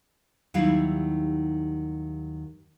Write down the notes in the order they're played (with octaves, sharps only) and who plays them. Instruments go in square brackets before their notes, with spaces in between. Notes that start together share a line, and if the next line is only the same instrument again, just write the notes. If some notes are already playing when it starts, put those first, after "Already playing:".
[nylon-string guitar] D#2 D#3 F#3 G3 E4 F5